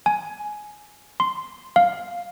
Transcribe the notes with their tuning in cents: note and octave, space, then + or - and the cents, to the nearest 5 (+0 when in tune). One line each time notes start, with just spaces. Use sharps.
G#5 +15
C6 -5
F5 +10